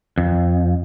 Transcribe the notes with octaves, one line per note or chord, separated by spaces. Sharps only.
F2